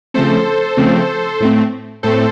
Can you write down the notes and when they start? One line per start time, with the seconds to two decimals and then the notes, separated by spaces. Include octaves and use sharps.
0.14 C#3 F3 A3 C4 A4 C5
0.77 C#3 F3 A3 C4
1.40 A2 A3 C4
2.03 A2 A3 C4 A4 C5